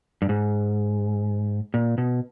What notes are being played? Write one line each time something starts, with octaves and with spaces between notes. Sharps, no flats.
G2
G#2
A#2
B2